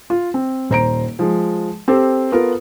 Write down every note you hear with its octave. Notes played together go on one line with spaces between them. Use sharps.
F4
C4
D#1 C5 A#5 D7
F3 G#3
C4 G4 A4 C5
B3 F4 A4 A#4